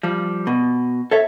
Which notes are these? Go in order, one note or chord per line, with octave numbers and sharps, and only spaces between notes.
F3 G3
B2
A4 C#5 E5